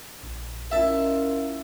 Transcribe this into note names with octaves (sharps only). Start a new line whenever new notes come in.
A#1
C#4 E4 F4 A#4 D#5 E5 A5